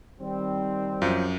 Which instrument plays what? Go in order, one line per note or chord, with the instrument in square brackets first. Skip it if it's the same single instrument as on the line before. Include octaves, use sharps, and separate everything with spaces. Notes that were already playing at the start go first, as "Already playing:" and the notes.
[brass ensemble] D#3 G3 C4
[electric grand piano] F#2 [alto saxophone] F3